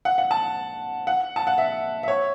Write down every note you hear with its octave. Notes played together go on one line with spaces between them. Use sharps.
F#5
F#5
A5
F#5
A5
F#5
E5
E5
C#5